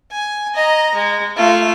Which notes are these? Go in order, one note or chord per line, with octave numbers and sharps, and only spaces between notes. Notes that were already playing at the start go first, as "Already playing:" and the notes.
G#5
D#5 A#5
G#3
A3 F4